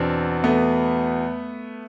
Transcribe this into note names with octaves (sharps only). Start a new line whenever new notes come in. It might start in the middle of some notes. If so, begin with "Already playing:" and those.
Already playing: E2 B2 C4 D4
A3 B3